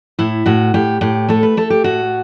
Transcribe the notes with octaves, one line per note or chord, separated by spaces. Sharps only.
A2 E4
A2 F#4
A2 G4
A2 G4
A3 A4
B4
A3 A4
G4
A2 F#4